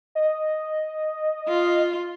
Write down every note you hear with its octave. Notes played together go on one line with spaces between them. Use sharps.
D#5
F4